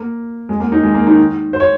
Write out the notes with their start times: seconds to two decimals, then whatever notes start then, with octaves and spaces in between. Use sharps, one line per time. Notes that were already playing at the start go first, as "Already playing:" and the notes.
Already playing: A#3
0.49 G#3
0.60 A#3
0.72 D#3 D#4
0.83 G#3
0.94 A#3
1.07 D#3 D#4
1.53 C5
1.60 C#5